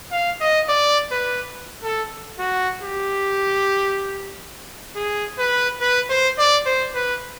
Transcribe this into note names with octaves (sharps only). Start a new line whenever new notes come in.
F5
D#5
D5
B4
A4
F#4
G4
G#4
B4
B4
C5
D5
C5
B4